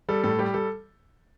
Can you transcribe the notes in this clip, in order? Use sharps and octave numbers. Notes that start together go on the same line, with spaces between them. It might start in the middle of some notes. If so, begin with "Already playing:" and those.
G3 A4
A2 A4
G3 G4
G3 A4